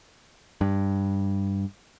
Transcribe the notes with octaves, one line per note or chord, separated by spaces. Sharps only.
G2